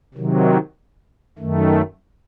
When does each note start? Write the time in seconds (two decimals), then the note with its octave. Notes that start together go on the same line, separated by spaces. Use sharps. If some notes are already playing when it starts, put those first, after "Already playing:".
0.14 C3 D#3 F#3
1.38 F#2 D#3 A3